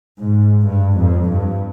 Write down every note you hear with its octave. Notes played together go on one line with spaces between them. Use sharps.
G#2
G2
F2
G2